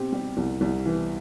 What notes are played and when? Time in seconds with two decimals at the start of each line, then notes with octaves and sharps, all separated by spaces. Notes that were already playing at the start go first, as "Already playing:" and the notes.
Already playing: B2 C4 G4
0.12 G3 G4
0.37 C2
0.61 C2
0.86 E3